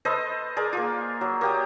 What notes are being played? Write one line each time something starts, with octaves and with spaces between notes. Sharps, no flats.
A4 B4 C5 D#5
G#4 A#4 D5
A#3 F4
F#3
A#3 G4 D#6